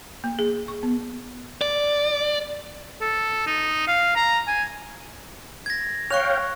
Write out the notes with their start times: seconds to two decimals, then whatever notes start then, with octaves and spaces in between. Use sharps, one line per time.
0.24 A#3
0.39 G#4
0.68 C#6
0.83 B3
1.61 D5
3.01 A4
3.47 D#4
3.87 F5
4.16 A#5
4.47 G#5
5.66 G#6 A#6
6.10 C#5 F5 G5 C#6 F#6 F7